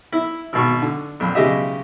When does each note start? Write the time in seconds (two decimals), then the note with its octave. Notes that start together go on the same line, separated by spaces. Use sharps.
0.12 E4
0.53 G#1 B2 C#6
0.82 D3
1.20 A#1 F2
1.35 B1 C#3 G#3 G4 D#5 E5